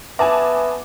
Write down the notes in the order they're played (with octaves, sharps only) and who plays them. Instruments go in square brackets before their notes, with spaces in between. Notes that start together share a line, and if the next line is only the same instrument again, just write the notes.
[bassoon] B3 [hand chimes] E5 [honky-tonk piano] G#5 A5 D6